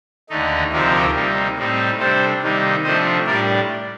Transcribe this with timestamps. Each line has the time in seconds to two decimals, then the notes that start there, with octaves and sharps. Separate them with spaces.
0.30 D#2 D3 A3 D#4
0.72 D2 C3 F3 C4 D#4 G4 A#4
1.14 C3 G3 A#3 D#4
1.57 A2 G3 C4 D#4
1.99 C3 G3 D4 A4 C5
2.42 C3 D#3 G3 A#3 D#4
2.84 C3 F3 A3 D4 C5 D#5
3.26 A2 G3 D4 A#4 D5